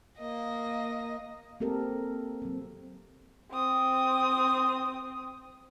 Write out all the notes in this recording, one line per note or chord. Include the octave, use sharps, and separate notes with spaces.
A#3 D#5
A#3 C4 G4 A4 A#4
F#3 C4
C4 D#6